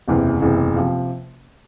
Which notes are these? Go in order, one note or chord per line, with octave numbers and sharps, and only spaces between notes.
F#1 E2 C3 E3
F#1 E2 C3 E3
C3 F3